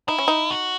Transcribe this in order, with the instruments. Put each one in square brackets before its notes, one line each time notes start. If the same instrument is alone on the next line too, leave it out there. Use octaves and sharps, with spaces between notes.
[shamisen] D#4 [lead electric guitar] E4
[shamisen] C#4
D#4
[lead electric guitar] F#4